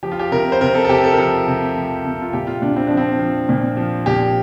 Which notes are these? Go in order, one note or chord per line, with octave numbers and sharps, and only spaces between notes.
F3 G4
F4
G4
C3 A#4
C5
C3 A#4
A4
A4
C3 G4
A4
A#4
F3 A4
C3
F3
C3
F4
A#2 G4
F4
A#2 D4
C4
F3 D4
C4
F3
A#2
F3
A#2 G4